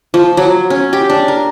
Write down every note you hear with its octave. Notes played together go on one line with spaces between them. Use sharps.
F3
F#3
C#4
G4
D4
A#4